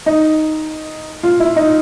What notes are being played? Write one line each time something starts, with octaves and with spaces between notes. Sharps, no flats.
D#4
F4
E4
D#4